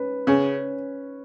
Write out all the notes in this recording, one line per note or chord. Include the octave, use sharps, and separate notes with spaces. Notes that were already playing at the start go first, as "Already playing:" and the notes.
Already playing: C#4 B4
C#3 C#4